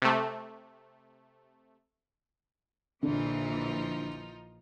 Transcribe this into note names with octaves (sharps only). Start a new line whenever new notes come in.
C3 A3
A#1 D3 E3 F3 D4 D#4 F4